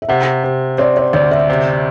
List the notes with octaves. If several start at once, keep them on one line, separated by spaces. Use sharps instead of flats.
E5
C3 F#5
C3
C4 D5
D5
D2 D5
E5
C3